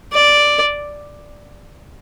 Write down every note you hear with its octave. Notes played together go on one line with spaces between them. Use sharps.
D5